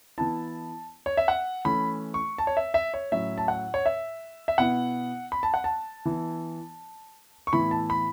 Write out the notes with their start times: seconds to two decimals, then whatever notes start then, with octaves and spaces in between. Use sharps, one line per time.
0.18 E3 B3 E4 A5
1.06 C#5
1.17 E5
1.28 F#5
1.65 E3 A3 C#4 B5
2.14 C#6
2.38 A5
2.47 C#5
2.57 E5
2.74 E5
2.94 C#5
3.12 A2 F#3 C#4 E4 E5
3.38 A5
3.48 F#5
3.74 C#5
3.86 E5
4.48 E5
4.58 B2 B3 E4 F#5
5.32 B5
5.43 A5
5.54 F#5
5.64 A5
6.05 E3 B3 E4
7.47 C#6
7.52 A2 E3 B3 E4 B5
7.71 A5
7.90 B5